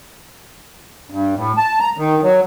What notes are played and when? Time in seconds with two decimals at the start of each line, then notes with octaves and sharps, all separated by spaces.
1.10 G2
1.36 A2
1.57 A5
1.79 A#5
1.97 D#3
2.23 F#3